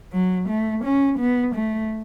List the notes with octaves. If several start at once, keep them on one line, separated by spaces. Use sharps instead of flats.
F#3
A3
C#4
B3
A3